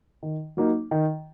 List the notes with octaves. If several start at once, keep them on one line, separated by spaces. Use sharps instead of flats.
D#3
F#3 A#3 D#4
D#3